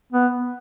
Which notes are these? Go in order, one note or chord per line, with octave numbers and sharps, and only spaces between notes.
B3